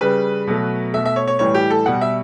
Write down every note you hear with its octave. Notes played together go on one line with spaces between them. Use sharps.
C#3 G3 B4
B2 F#3 A3
B2 A3 E5
E5
C#5
C#5
A2 E3 G3 C#5
G4
A4
B2 G3 F#5
E5